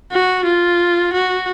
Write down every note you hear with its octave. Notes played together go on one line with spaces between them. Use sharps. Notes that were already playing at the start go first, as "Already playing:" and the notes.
F#4
F4
F#4